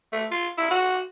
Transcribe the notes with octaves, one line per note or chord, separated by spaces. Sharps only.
A3
F4
E4
F#4